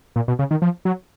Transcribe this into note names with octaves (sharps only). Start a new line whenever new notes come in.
A#2
B2
C#3
D#3
F3
F#3